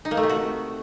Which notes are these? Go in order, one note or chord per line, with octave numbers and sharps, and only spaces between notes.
D#4
A#3
A3
C3
F#4